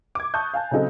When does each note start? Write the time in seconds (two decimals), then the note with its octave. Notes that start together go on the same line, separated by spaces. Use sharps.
0.15 D6 G#6
0.34 A5 C#6 D#6 F#6 G6
0.54 F5 G#5 A5
0.71 C#3 F#3 C4 D#4 G#4 A4